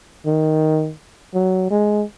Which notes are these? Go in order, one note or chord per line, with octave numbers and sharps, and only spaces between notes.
D#3
F#3
G#3